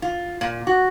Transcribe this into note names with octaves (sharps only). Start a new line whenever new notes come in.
F4
A#2
F#4